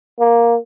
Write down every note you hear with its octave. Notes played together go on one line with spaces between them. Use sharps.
A#3